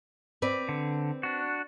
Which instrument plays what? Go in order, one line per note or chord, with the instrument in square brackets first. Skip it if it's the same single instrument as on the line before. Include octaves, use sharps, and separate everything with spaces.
[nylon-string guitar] C4 B4 D5
[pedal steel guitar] D3
D4 F#4